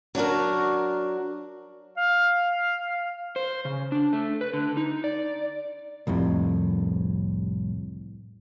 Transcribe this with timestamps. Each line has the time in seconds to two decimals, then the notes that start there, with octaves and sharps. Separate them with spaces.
0.15 F#3 D4 F#4 A#4
1.97 F5
3.36 C5
3.65 C#3
3.92 D4
4.13 A3
4.41 B4
4.53 D3
4.77 D#4
5.04 D5
6.07 C2 F2 A2 C3